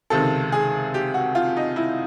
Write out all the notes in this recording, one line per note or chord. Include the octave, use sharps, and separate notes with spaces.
C#2 C3 D#3 A4
G#4
G4
F#4
F4
D#4
E4